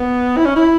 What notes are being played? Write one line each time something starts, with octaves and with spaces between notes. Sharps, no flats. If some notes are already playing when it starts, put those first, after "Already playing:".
Already playing: B3
E4
C#4
E4